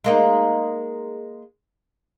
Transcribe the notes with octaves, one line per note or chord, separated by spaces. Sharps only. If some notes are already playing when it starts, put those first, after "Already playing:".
G#3 A#3 D#4